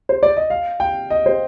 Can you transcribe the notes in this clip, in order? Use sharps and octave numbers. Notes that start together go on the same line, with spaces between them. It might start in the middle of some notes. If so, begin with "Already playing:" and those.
C5
D5
D#5
F5
G5
D#5
C5